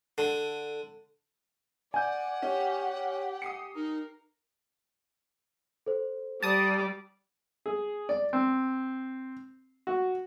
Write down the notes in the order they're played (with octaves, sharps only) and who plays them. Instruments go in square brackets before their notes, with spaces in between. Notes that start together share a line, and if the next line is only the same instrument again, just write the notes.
[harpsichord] D3
[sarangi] D5 [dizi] F#5 [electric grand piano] G#5 G6
[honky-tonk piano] C#4 [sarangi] G4
[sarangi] G4
[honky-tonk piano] D#6 C7 C#7
[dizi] D#4 [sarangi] A#4
[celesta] A4 C5
[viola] G3 D5 [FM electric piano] A5 D#6
[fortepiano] G#4
D5
C4
F#4